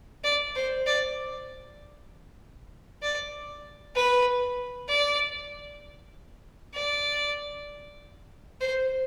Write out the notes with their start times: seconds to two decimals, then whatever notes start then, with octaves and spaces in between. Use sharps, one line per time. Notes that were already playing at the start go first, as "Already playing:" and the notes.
0.24 D5
0.56 C5
0.86 D5
3.02 D5
3.95 B4
4.89 D5
6.74 D5
8.61 C5